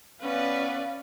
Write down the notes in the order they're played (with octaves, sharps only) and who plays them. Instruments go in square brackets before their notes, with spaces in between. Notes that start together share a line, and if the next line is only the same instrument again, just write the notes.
[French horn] B3 [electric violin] C#4 [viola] B4 D5 [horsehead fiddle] F5